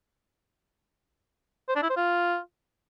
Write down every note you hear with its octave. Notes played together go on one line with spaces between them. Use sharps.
C5
D4
E4
C5
F4